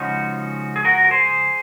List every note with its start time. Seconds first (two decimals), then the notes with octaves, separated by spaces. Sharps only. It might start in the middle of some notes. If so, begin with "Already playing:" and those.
Already playing: C#3 F3 G#3 C#4 D#4 F#4
0.76 G#4
0.85 F#4 A#4
1.04 A#4
1.11 G#4 C5